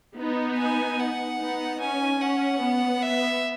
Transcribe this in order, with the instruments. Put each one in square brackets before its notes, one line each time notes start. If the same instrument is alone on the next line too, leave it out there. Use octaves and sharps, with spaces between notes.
[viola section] B3 D#4
[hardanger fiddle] G#5
F#5
[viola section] B3 D#4
[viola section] C#4 [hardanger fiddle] G#5
[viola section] C#4 [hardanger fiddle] F#5
[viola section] B3
[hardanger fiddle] E5